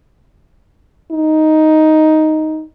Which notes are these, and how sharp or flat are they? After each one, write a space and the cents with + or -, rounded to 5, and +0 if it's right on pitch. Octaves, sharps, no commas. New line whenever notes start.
D#4 +5